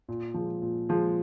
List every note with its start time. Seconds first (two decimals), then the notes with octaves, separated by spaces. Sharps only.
0.08 A#2
0.34 F3 G#3
0.62 A#2
0.89 F3 G#3